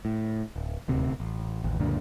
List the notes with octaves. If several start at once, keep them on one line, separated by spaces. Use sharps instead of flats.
A2
D1
D#1 D2 C3
A1
A1 D#2
C#2 F#2 A#2 D3